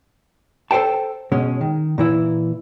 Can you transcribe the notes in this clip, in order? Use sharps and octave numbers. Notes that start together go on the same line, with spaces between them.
A4 C5 F5 G5 A5
B2 G#3 C#4
D#3
A#2 E3 E4